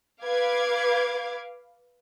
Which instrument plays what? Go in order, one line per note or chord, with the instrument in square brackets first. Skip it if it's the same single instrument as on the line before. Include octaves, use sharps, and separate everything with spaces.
[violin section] B4 F5 D6 G#6